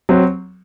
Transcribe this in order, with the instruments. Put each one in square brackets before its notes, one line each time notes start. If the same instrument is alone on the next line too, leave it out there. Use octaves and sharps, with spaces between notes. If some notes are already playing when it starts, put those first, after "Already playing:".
[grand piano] F#3 C4